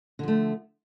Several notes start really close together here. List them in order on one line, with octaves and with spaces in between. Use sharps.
D3 F3 A3